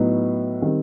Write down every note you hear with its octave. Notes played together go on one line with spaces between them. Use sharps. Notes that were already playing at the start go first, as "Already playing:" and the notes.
Already playing: A2 F#3 B3 D#4
D#3 G3 C4